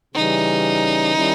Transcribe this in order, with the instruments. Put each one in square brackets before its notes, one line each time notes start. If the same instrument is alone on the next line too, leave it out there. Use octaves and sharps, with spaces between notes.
[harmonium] C#3 E3 G3 C#4 [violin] D#4
[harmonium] D#3 G3 C#4 E4